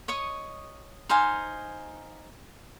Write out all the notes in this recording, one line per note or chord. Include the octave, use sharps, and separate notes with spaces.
C#5 D#5 C#6 D#6
D#4 C5 F5 G#5